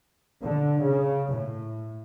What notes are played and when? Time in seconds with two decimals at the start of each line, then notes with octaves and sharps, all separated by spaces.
0.43 D3
0.83 C#3
1.33 A2